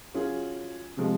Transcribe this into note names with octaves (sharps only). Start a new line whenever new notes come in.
F#3 C#4 F4 G#4
C3 F3 G#3